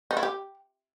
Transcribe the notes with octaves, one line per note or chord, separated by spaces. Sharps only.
D#4
E4
G4